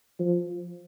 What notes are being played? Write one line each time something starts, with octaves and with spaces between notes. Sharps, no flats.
F3